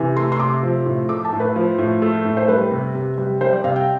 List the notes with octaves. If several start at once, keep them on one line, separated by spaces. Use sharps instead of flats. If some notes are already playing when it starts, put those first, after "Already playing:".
Already playing: C3 E3
A3 C6
C6
C3 D6
F3
A2
A3 D6
A5
A2
B4
F3
A2
A3
A2
C5
G3 B4
C3
C3
G3
G3 C5
D5
C3 F5
G5